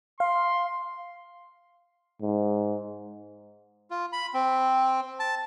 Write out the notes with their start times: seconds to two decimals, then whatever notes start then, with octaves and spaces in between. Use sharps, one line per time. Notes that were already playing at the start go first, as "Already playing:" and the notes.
0.20 F5 C6
2.22 G#2
3.91 F4
4.13 B5
4.34 C4
5.20 A5